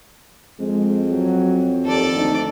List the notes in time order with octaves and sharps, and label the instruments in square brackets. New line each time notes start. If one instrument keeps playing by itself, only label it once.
[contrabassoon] F2 [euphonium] G#3
[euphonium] F#3
[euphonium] D#2 [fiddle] A4 D5
[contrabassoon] D2 [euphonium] D#4